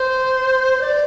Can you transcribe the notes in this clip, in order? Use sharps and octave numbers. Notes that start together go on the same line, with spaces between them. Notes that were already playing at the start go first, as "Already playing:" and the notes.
Already playing: C5
D5